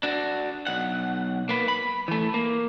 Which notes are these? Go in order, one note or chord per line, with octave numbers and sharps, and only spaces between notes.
D4 F#4
B1 F#5
A#3 B4
B5
E3 A3
A#3